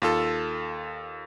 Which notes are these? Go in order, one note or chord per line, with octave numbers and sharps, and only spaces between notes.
D#2 F4 A4